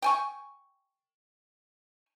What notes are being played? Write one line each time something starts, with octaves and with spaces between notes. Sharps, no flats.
G5 G#5 C#6